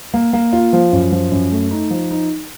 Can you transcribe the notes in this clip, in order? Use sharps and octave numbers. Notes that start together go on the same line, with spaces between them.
A#3
A#3
F4
F3
F#2
F3
F#2
A3
D#4
F3
D#4